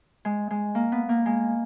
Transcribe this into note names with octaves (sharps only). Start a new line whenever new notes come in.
G#3
G#3
A#3
B3
A#3
G#3